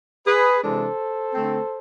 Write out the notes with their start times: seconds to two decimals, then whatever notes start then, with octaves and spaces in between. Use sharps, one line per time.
0.27 G#4 B4
0.63 C3 E3 G#3 D4 A4 C5
1.34 D3 A3 C4